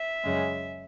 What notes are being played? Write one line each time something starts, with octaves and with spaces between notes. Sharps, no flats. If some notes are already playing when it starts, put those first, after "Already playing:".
Already playing: E5
F#2 C#3 G#3